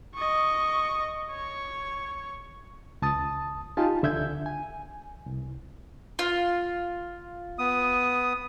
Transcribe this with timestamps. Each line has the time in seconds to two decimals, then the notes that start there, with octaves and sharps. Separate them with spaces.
0.15 D#5 C#6
1.31 C#5
3.02 C#2 A5 D#6 A6
3.77 D#4 F4 G4 G#5 A5
4.02 C#2 D3 E5 G6 G#6
4.46 G#5
5.26 C2
6.19 F4
7.59 B3 D#6